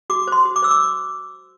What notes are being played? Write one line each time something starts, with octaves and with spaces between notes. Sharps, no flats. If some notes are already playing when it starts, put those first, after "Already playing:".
F#4 D6
C5 C6
F#4
D6
C5 E6
D6